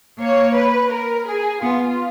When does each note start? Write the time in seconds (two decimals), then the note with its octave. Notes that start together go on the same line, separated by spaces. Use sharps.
0.19 A#3 C#5
0.55 B4
0.91 A#4
1.26 G#4
1.62 B3 F4